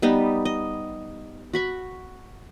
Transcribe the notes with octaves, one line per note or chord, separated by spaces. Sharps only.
G3 B3 D#4
D#5
F#4 B5 C#6